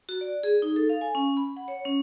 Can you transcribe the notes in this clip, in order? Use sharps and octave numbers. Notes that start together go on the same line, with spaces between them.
F#4
D5
G#4
D#4
A4
F5
G#5
C#4
B5
F#5
C#5
C#4